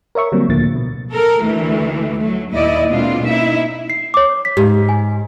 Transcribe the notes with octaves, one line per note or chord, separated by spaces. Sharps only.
A#4 C#5 E5 C#6
D3 F#3 G3 A#3 C4
C#2 A2 D3 F3 A#3 A6
B2
A4 A#4
D2 E3 A3
F#3 A3
D#2 A#2 E4 D5 D#5
B2 G#3 A#3 C4 D4 F4
A#3 C#4 D#4 E4 E5
C7
C#5 D6
B6
G#2 G4
G#5